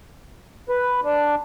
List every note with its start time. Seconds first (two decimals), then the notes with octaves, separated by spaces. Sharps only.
0.69 B4
1.04 D4